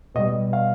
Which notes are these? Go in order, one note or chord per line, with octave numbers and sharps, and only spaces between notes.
B2 G3 D#5
F5